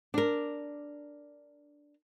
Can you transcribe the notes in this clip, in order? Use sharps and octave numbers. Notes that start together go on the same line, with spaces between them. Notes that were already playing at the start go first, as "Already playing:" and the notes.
D4 A#4